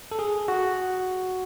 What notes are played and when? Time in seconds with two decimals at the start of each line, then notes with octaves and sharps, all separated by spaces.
0.12 A4
0.19 G#4
0.48 F#4